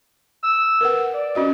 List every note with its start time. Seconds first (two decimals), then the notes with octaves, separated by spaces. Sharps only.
0.43 E6
0.81 A#4 B4 F#5
1.14 D5
1.35 C#4 F#4 D#5